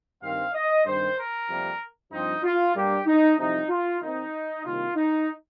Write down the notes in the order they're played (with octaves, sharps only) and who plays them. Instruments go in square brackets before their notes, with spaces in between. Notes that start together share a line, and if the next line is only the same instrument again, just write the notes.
[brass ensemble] G2 D#3 C4 F5
D#5
G2 D#3 C4 C5
A#4
F2 C3 G3 A#3
G2 F3 C4 D#4
F4
G2 G3 A#3 G4
D#4
C2 C3 F3 D#4
F4
D#2 D#3 C4 D#4
C2 C3 D#3 A#3 F4
D#4